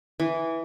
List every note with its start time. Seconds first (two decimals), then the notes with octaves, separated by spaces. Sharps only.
0.20 E3